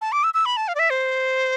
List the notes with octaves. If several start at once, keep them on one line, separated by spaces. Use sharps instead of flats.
A5
D6
E6
E6
B5
A5
F5
D5
E5
C5